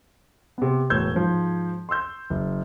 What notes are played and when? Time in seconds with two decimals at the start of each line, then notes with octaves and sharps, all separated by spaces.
0.58 C3 B3
0.90 E1 A2 B4 E6 G6 G#6
1.14 G#2 F3
1.89 C6 C#6 E6 G6
2.30 F#1